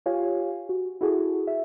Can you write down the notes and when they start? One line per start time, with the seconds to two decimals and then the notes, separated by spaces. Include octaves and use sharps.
0.06 F4 G4 C#5 F5 G#5
0.69 F#4
1.01 E4 F#4 G#4 A4
1.47 E5